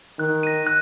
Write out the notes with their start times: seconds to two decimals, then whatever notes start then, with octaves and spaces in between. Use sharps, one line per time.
0.19 D#3 F#6
0.43 A#6 D#7
0.67 F#6